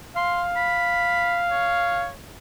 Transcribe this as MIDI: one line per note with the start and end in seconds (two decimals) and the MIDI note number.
0.16 2.09 77
0.16 0.42 84
0.56 1.39 83
1.51 2.13 73